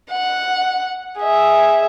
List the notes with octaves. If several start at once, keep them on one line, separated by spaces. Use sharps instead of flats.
F#5
G#4 E5